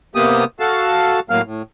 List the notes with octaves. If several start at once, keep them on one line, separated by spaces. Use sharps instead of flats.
C3 A#3 B3 G4 D#6
F#4 A4 F5 A5
A2 F#3 A#3 F5 F6
A2